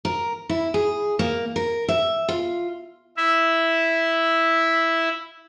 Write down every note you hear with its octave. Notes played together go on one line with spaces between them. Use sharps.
A#4
E4
G#4
A#3
A#4
E5
F4
E4 E5